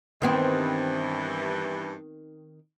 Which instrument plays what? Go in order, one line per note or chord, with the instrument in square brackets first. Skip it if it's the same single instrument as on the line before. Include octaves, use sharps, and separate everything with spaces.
[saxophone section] G2 E3 [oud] D#3 B3 C4